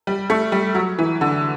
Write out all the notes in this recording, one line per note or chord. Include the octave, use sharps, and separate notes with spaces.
G3
A3
G3
F#3
E3
D3